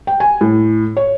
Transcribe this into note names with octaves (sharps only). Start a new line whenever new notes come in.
G5
G#5
A2
C#5